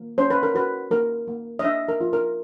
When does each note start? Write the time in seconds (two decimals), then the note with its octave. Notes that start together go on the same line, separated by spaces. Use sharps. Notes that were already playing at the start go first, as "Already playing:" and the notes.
Already playing: A#3
0.18 C#4 C5
0.30 B4
0.43 A#4
0.54 F#4 B4
0.91 A#3 A#4
1.28 A#3
1.59 D#5
1.64 D4 E5
1.88 A#4
2.01 F4
2.13 A#4